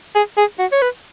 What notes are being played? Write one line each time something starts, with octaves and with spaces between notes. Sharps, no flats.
G#4
G#4
F#4
C#5
B4